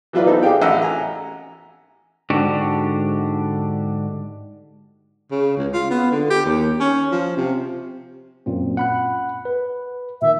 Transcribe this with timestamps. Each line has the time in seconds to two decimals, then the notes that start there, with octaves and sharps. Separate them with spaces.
0.13 E3 F#3 E4 F4 B4 D5
0.27 B3 C4 D#4 A4
0.43 G4 G#4 D5 F5 G5
0.62 A1 D#5 F#5 A#5 E6
0.82 G#5 A#5
2.30 G#2 D3 D4 F#4 G4
5.31 C#3
5.57 C#2
5.73 F4
5.90 B3
6.11 D3
6.30 G4
6.45 D#2
6.80 C#4
7.12 F3
7.37 C3
8.46 F#2 A#2 C4
8.77 F#5 B5 F#6
9.45 B4
10.22 A#2 D#3 E5